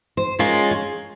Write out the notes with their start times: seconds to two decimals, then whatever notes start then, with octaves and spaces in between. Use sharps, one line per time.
0.17 C5
0.39 G#3 C#4 F4 A#4
0.71 G#4